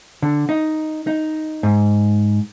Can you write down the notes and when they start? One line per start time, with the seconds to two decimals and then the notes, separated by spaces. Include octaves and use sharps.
0.22 D3
0.49 D#4
1.07 D#4
1.63 G#2